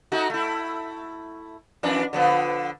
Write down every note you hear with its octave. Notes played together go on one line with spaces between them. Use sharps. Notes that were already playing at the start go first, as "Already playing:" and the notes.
A3 D#4 F#4
A3 E4
F2 E3 D4
D3 F3 B3